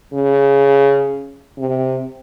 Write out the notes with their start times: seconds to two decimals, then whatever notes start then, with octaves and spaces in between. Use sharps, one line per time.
0.14 C#3
1.58 C3